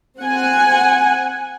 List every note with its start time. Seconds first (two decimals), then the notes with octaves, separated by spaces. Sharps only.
0.20 C4 F#5 G#5